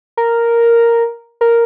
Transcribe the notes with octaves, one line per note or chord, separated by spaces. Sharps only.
A#4
A#4